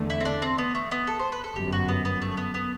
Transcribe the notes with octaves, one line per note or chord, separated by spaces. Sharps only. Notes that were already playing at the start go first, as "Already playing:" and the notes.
Already playing: E2 D3 A3
E4
C4
D4
C4
B3
A3
B3
A4
C5
B4
A4
G1 F#2 F#3 G4
F#4
B3
B3
A3
B3
B3